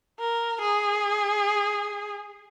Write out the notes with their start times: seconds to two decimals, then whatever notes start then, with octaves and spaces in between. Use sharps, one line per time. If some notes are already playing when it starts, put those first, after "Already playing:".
0.19 A#4
0.61 G#4